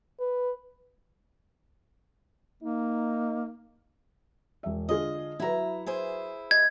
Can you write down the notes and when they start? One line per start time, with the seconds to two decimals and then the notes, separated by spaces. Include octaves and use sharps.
0.20 B4
2.63 A#3 D#4
4.63 E1 E5
4.89 D3 F4 G#4 D#5
5.40 F#3 E4 F#4 B4 A#5
5.86 E4 G#4 C5
6.51 D#5 G#6